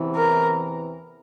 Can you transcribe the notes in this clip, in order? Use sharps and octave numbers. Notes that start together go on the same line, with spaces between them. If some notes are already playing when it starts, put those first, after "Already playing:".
Already playing: E2 C3 E3
A#4